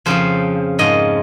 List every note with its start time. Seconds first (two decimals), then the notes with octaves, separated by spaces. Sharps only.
0.06 F2 C#3 F3 C5
0.79 G#2 F3 D#5